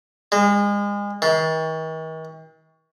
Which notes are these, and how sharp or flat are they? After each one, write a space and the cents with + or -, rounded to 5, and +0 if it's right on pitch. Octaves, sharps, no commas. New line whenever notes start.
G#3 -35
D#3 +45